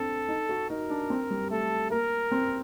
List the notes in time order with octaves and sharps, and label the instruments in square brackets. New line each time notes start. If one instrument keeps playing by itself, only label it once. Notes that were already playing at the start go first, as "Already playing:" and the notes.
Already playing: [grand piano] C4 D4 [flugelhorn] A4
[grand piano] D#4
F#4
[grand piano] D#4 [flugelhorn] A#4
[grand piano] D4
C4
G3
[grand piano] A3 [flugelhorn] A4
[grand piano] A#3 [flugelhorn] A#4
[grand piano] C4